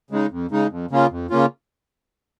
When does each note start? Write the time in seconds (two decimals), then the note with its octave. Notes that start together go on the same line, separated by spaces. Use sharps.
0.11 C#3 G#3 D#4
0.31 F2
0.51 C#3 G#3 D#4
0.70 F2
0.91 C#3 A#3 C#4 F4
1.11 F2
1.30 C#3 A#3 C#4 F4